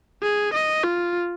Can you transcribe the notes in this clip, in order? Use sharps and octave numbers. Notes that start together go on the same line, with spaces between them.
G#4
D#5
F4